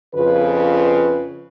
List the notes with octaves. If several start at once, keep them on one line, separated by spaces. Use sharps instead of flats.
F2 C#3 F4 B4